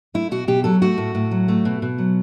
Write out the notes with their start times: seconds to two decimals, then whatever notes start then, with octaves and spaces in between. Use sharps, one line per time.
0.14 A3 E4
0.31 B2 F#4
0.48 B2 G4
0.64 F#3 A4
0.82 A3 F#4
0.98 A2
1.15 A2
1.31 F#3
1.48 A3
1.65 B2
1.82 B2
1.98 F#3